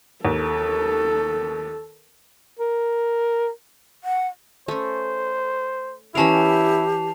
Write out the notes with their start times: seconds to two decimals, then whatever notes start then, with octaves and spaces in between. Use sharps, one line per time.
0.25 D#2 A4
2.59 A#4
4.04 F#5
4.68 A3 C#4 C5
6.15 E3 C#4 E4 G4 A#4 A5 C7 F7